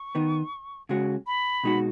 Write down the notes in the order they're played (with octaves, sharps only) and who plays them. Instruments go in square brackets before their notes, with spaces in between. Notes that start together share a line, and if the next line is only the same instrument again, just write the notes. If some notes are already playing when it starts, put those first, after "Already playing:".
Already playing: [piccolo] C#6
[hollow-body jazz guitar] D#3 B3 D#4
C#3 G#3 C#4 F#4
[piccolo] B5
[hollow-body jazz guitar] B2 G#3 D#4 F#4